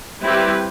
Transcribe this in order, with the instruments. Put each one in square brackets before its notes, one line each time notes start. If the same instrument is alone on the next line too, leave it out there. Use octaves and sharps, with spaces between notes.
[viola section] G3 C4 E4 G4 B4